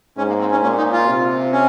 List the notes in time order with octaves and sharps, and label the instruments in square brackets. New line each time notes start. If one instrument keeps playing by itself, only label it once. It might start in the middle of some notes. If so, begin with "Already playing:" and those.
[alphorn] G#2 [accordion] C#4
[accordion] A#3
C4
C#4
[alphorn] A#2 [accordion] C#4
[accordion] D#4
F4
[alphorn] C3
[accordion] C#4